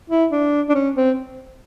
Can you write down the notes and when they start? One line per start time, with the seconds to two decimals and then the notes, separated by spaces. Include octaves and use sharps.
0.10 E4
0.32 D4
0.69 D4
0.75 C#4
0.96 C4